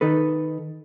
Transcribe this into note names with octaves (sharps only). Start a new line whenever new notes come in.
D#3 D#4 A4 B4